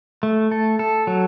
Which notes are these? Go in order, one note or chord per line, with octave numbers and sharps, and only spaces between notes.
A3
A4
A4
F#3